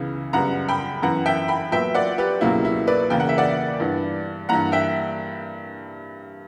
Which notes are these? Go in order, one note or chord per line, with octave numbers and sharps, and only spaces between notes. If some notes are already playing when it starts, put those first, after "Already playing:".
Already playing: C#2 C#3 E3 B3
F#2 C#3 G3 B3 F#5 A#5
G5 B5
F#2 E3 B3 F#5 A#5
E5 G5
G5 B5
A#2 F#3 B3 E5 G5
D5 F#5
G4 B4
C#2 B2 F#3 A#3 E4
E4
B4 D5
E2 C#3 E3 A#3 G5
F#5
E5
D5 F#5
G2 E3 B3
G2 E3 A#3 F#5 A#5
E5 G5